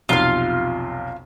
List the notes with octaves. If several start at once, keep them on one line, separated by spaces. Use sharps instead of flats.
B1 F2 C3 F4 F5